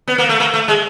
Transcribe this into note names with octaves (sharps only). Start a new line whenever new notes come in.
B3
A#3
A3
A#3
A3
G#3